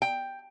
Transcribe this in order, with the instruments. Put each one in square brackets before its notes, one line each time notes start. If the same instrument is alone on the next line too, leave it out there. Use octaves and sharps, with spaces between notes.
[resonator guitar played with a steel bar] G5